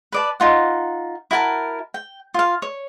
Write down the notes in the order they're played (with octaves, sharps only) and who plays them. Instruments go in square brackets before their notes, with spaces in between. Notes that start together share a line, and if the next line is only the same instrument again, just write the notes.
[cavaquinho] B4 D5 A5
D#4 F4 F#5
E4 F#4 A#4 A5
G5
F4 F5
C#5